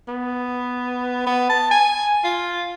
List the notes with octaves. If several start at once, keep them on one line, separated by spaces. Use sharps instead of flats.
B3
B3
A5
G#5
F4